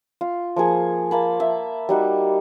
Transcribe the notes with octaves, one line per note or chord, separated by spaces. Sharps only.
F4
F3 A#3 G#4 C#6
A#3 A5 B5
E5
G3 D#4 F#4